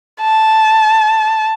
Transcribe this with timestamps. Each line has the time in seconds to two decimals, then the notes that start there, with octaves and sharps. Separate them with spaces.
0.21 A5